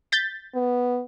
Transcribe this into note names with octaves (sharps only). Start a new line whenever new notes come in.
G6 A6 B6
B3